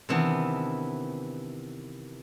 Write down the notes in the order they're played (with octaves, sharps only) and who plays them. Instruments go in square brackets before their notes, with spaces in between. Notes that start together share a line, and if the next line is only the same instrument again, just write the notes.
[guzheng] C3 D#3 E3 B3 D4